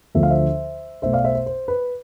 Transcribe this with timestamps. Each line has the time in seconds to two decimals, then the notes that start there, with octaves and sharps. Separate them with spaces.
0.15 D2 D3 F3 A3 E5
0.23 F5
0.30 C5 E5
1.02 B1 B2 A3 C5 E5
1.13 D5 F5
1.24 C5 E5
1.35 C5
1.46 C5
1.68 B4